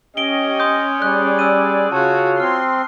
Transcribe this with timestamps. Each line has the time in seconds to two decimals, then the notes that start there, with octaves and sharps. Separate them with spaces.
0.17 C#4 G4 D#5 D7 G7
0.60 C6 D#6 G6
1.02 G3 G#4 D5 D#6 F#6
1.39 E6 F#6 D#7
1.92 C#3 C#4 F4 F#4 C#5 A5 F#6
2.40 C4 C6 F6